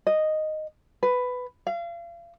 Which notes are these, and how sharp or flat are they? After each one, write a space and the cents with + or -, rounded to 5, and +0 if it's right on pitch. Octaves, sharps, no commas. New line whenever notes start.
D#5 -5
B4 +10
F5 -35